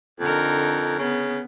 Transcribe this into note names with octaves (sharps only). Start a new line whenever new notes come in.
F2 D3 D#4 A#4
C#3 B3